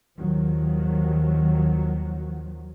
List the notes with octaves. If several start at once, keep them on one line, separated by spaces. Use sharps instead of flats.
D#2 D#3 F3 F#3